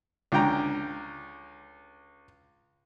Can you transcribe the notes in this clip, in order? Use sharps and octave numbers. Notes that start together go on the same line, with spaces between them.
C#2 D3 G5 A#5